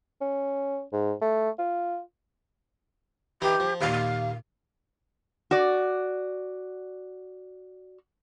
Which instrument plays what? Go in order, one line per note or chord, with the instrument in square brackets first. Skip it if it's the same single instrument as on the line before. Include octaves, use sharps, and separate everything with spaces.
[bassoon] C#4
G#2
A3
F4
[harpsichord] E3 D#4 [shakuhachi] G4
[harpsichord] F3
[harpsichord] D#2 A#2 [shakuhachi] F5
[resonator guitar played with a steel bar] F#4 D5